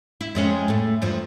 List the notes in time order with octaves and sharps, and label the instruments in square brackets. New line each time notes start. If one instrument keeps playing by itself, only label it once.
[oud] E4
F2 G#3 C#4
A2 A3
E2 G2 F3